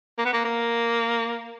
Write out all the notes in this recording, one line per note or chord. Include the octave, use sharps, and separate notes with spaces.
A#3
B3
A#3
A#3